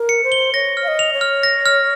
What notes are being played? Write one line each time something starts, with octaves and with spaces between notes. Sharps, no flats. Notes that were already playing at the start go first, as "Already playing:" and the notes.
Already playing: A#4
C#7
C5
G7
C#5 A#6
F6
F5
D#5
F7
C#5
F6
A#6
F6